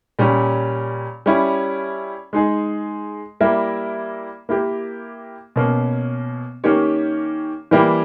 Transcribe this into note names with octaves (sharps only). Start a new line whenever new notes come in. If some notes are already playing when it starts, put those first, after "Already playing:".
A#2 G3 C#4
G3 C#4 E4
G#3 D#4 G#4
G3 A#3 E4 A#4 E5
A#3 E4 G4 A#4
B2 A#3 C#4
D#3 A#3 C#4 G4 C#5
E3 G3 A#3 E4 G4